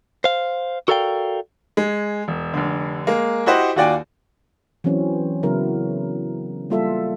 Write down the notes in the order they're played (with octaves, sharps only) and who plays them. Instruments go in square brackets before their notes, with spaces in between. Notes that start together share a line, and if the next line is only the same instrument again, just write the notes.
[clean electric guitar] C5 F5
F#4 A4 A#4 D5 F5 G5
[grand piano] G#3
E1
F1 D3
G#3 A#3
E4 F#4 G4 C5 D#5 F#5
D#2 F4 F#4 D5 G5 G#5
[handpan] E3 F#3 C4 C#4
C#3 F#3 B3 E4 A#4
G3 A#3 F4 A4 E5